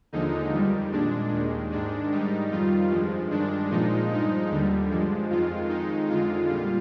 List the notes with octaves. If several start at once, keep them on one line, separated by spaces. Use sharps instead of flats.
D#2 D3 F3 G#3 D#4
F2 D#3 G3
A#2 G#3 D4
D#2 D#3 G#3
G#2 D#3 G#3 D4
G#2 D#3 G3 D#4
F2 D#3 G3 F4
G2 F3 G#3
G2 D#3 G#3 D4
A#2 F3 G#3 D#4
G2 F3 G#3 D#4
D#2 D3 G3
G2 F3 G#3
F2 D#3 G#3 F4
F2 D#3 G#3 D#4
F2 D3 G#3 F4
A#2 G3 F4